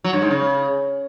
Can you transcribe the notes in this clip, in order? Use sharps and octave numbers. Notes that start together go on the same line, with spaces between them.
F#3
G2
G#2
C#3